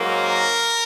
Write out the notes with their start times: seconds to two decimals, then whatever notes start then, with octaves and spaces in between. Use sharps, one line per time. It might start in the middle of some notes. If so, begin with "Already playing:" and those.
Already playing: G#2 F#3 A#3
0.09 A#4